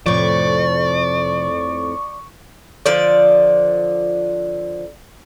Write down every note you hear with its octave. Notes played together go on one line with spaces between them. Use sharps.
F2 A2 C3 F3 D5 C#6
D3 F3 D5